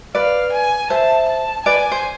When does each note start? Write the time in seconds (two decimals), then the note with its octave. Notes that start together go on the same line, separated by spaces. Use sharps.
0.15 B4 D5 F5
0.52 G#5
0.90 C5 E5 A5
1.28 A5
1.66 B4 D5 G#5
1.91 C5